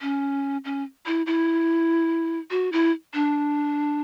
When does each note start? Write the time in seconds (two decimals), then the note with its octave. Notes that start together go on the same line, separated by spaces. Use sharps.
0.01 C#4
0.65 C#4
1.06 E4
1.26 E4
2.51 F#4
2.72 E4
3.14 D4